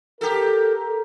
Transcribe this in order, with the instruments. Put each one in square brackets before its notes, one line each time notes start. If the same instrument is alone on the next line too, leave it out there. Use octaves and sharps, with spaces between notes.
[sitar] G4 A4 [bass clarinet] A#4